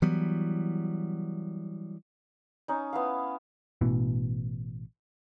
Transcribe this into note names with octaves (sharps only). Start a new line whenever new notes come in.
E3 F#3 G3 B3
C#4 D#4
B3 E4 F5
A1 B2 E3